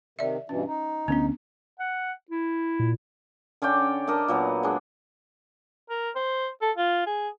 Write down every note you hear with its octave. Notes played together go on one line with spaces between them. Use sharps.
C3 D#3 D5 E5
G2 B2 E3 C#4
D#4
D2 B3 C#4 D4
F#5
E4
A#2
D3 C#4 D5 G5
D4 A#4 D#5 A5
A#2 F#3 B3
G#3 D4
A#4
C5
A4
F4
G#4